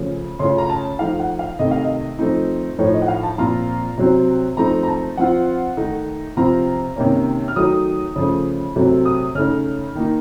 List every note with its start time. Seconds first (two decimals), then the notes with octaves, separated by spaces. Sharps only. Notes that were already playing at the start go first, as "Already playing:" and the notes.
Already playing: C#3 F3 A3 C#4
0.39 C#3 A3 C#4 F4 C6
0.58 A#5
0.70 A5
0.99 F3 A3 D#4 F5
1.20 F#5
1.39 F5
1.59 C3 D#3 A3 D#5
1.71 F5
1.84 D#5
2.19 F3 A3 C4 D#4
2.78 A2 F3 A3 D#4 C#5
2.94 D#5
3.02 F#5
3.08 F5
3.23 A5
3.38 A#2 F3 C4 F4 A#5
3.98 C3 F#3 C4
4.57 F3 A3 C4 D#4 A#5
4.83 A#5
4.88 A5
5.17 F3 C4 F4 F#5
5.77 D#3 A3 D#4
6.37 C3 F3 C4 F4 A#5
6.96 C3 D#3 A#3 C#4
7.48 F6
7.56 D#3 F#3 A3 D#4 D#6
8.16 C#3 F3 A3
8.76 C3 F#3 A3 C4
9.05 D#6
9.35 C#3 A3 D#4 F6
9.95 D#3 A#3 D#4